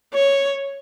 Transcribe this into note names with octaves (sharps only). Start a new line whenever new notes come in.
C#5